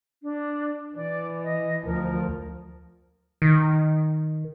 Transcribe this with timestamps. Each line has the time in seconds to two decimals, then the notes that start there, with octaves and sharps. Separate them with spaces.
0.23 D4
0.96 E3 D5
1.44 D#5
1.85 D2 F3 A#4
3.42 D#3